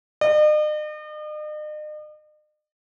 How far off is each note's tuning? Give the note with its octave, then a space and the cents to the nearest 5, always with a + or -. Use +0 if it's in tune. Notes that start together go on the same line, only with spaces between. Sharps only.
D#5 -45